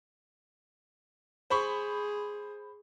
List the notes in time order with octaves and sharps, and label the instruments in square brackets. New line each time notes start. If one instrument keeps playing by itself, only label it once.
[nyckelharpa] G#4 [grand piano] C5 B5 C#6